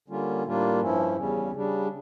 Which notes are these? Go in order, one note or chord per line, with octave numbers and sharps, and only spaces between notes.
D3 G3 A#3 C#4 F4
A2 G3 A#3 D4 F4
G2 F3 C#4 E4
E2 C#3 G3 C#4
C#3 G3 D4